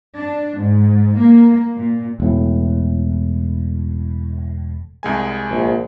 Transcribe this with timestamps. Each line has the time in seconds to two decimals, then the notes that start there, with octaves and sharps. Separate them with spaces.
0.17 D4
0.60 G#2
1.19 A#3
1.76 A#2
2.20 E1 A2
5.03 C2 G#3 G#5
5.51 A#1